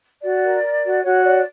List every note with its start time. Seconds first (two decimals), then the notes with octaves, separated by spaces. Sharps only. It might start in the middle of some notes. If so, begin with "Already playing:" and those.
0.22 F#4 D5
0.43 A#4
0.63 A#4
0.83 F#4
1.03 F#4 C#5
1.23 C#5 D5